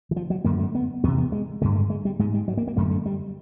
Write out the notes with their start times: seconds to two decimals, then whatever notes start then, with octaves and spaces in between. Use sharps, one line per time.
0.11 E3
0.16 F3
0.30 F#3
0.45 F#2 D3 A#3
0.59 A3
0.75 B3
1.04 E2 B3
1.08 C3
1.18 B3
1.32 G#3
1.62 G2 D3 G#3
1.75 G#3
1.90 G#3
2.05 G3
2.19 G#2 G#3
2.34 G3
2.48 F#3
2.57 A#3
2.67 A#3
2.77 F#2 D3 A3
2.91 A3
3.06 G3